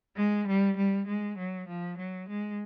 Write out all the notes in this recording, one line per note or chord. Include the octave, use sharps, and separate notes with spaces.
G#3
G3
G3
G#3
F#3
F3
F#3
G#3